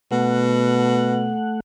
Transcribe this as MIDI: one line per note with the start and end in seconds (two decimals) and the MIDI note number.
0.12 1.37 47
0.12 1.60 57
0.12 1.60 78